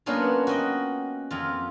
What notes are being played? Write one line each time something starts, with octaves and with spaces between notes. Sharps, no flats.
F#3 A#3 B3 C#4 D4 F4
F#4 D#5 G5
F2 F4